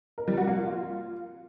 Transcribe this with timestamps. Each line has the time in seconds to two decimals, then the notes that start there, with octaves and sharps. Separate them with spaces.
0.18 A#4
0.28 G3
0.37 F#4
0.47 A#3
0.57 F4